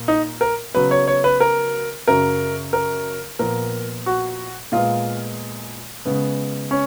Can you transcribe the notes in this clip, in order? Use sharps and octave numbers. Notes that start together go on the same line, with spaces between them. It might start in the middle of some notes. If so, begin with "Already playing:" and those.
Already playing: A#2 A#3
D#4
A#4
C#3 F#3 B3 B4
C#5
C#5
B4
A#4
F#2 C#3 F#3 A#4
A#4
A#2 F3 B3 A#4
F#4
A#2 G#3 B3 F4
C#3 G#3 B3
C#4